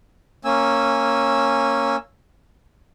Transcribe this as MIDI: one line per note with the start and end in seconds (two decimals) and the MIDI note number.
0.45 1.96 58
0.45 1.96 61
0.45 1.96 80
0.45 1.96 88